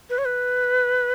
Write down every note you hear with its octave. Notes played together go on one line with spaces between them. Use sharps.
B4
C#5
B4